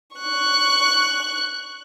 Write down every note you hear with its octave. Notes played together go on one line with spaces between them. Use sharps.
C#6 F#6